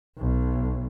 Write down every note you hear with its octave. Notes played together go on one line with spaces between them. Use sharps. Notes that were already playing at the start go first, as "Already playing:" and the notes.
B1